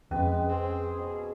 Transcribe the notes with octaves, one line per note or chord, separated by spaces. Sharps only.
F2 G#3 C#4 B4
C4 G#4
B2